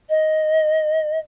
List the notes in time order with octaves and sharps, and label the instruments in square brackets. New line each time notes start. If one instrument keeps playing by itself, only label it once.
[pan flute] D#5